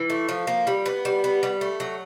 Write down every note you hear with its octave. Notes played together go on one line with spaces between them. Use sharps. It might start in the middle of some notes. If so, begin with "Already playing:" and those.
Already playing: E3
A3
F3
A#3
G3
B3
G3
B3
G3
A3
F#3